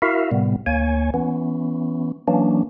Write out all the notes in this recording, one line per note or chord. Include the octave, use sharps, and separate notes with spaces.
E4 F#4 A#4 E5 F5
A2 C3 G3 B3
D2 A#3 C#5 G#5
E3 B3 C#4
E3 F#3 A#3 C#4 D4